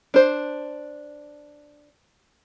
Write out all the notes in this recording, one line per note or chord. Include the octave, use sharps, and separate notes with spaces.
D4 C5